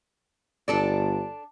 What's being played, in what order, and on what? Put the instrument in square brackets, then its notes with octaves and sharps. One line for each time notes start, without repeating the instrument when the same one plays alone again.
[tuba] G1 [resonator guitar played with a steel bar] D4 A4 D5